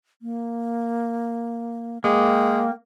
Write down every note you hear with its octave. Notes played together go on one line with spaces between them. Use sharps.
A#3
G#3 A#3 G5